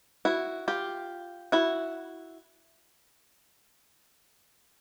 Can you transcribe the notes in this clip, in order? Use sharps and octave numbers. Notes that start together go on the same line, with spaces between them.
E4 F#4
F4 G4
E4 F#4